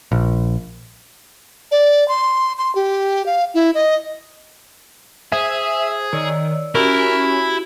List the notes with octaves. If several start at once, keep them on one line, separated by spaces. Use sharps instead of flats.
A#1
D5
C6
C6
G4
F5
E4
D#5
G#4 C5 E5
D#3 C#5 D5 E6
C#4 E4 F#4 G4 A#4